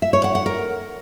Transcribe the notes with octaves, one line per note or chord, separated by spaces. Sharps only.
E5
C#5
F#5
F#5
A#4